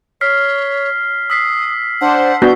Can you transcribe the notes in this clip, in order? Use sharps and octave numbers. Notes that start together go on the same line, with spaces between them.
C#5 F6 B6 C7
D#6 E6 B6 C7
D4 C5 F#5
B3 D4 F#4 G6